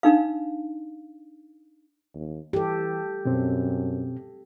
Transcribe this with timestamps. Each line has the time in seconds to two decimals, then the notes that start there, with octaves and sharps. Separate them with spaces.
0.03 D4 D#4 F5
2.14 D#2
2.53 E3 G4 A4
3.25 F#2 B2 C4